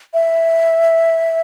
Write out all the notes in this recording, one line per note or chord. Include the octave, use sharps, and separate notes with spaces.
E5